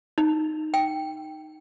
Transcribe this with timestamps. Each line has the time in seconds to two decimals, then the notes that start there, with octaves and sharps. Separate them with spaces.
0.18 D#4
0.74 G5